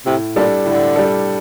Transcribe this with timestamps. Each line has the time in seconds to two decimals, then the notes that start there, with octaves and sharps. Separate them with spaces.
0.06 A2 C3
0.36 A#2 G3 D4 A4
0.65 A2 D3
0.96 G3 D4 A4